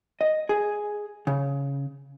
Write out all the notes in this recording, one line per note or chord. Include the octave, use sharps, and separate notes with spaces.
D#5
G#4
C#3